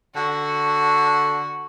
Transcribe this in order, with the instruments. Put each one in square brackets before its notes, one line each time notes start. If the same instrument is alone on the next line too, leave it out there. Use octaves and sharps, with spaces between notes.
[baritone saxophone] D3 [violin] F#4